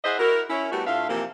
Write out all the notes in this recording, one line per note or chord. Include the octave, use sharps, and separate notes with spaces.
E4 G#4 C5 D#5 E5 F#5
E4 F#4 A#4
C#4 E4
G3 A3 B3 E4 F#4 G4
A2 D4 F4 E5 F5
C3 E3 F3 A#3 G4